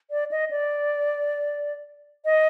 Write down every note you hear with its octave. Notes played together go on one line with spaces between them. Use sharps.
D5
D#5
D5
D#5